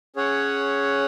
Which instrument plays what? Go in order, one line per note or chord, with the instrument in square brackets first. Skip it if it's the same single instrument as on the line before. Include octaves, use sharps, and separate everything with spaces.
[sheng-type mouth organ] C#4 G#4 C#5 F#5